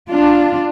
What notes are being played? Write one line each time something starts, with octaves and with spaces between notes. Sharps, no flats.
D4 F4